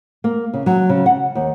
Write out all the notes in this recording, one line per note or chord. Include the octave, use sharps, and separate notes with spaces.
A#3
C#3
F#3
C#3
F#5
D#2